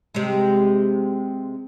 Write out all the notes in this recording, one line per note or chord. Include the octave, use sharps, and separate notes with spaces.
C3 G#3